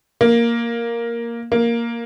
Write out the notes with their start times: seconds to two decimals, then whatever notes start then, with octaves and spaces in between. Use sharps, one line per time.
0.21 A#3
1.52 A#3